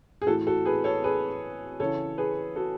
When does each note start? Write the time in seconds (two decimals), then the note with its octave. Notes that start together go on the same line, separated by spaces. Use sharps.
0.22 G#4
0.27 A2 E3 F#4 A4
0.47 F#4 A4
0.65 G#4 B4
0.84 A4 C#5
1.04 G#4 B4
1.80 C#3 E3 A4 C#5
2.18 G#4 B4
2.56 F#4 A4